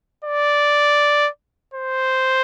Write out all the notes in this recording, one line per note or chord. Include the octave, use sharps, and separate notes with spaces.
D5
C5